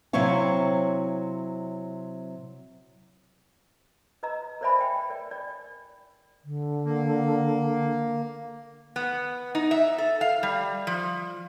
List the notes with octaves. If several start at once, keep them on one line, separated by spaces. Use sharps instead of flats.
C3 F#3 C4 E4 C#5 F5
B4 D#5 A#5 E6
A#4 C5 D5 E5 G#5 B5
G5
A#4 D5
D5
D3
A#3
B3
D#4
E5
A4
F5
G3
F3